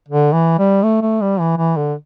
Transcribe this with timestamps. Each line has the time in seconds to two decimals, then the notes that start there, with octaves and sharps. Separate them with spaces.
0.09 D3
0.33 E3
0.59 G3
0.83 A3
1.02 A3
1.21 G3
1.40 E3
1.58 E3
1.77 D3